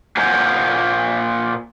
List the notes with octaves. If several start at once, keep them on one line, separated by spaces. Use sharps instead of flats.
A#2 A#3 C5 F#5 G#5 A#5